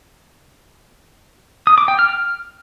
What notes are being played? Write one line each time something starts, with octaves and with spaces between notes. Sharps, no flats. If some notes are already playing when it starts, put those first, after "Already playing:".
D#6
D6
G5
F6
F6